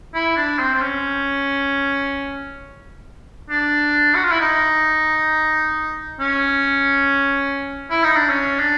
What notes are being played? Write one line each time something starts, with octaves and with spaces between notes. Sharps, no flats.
E4
D4
C4
C4
C#4
D4
F#4
F4
E4
D#4
C#4
E4
D#4
D4
C#4
D4